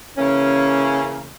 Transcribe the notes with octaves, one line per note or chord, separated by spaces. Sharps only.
C#3 E3 A#3 C#4